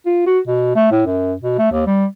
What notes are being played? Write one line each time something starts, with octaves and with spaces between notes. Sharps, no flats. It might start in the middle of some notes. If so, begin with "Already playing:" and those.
F4
F#4
B2
A3
A2
F#2
B2
A3
D#2
G3